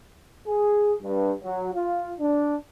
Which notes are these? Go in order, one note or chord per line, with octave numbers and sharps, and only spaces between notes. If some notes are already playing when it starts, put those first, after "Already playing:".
G#4
G2
F#3
F4
D4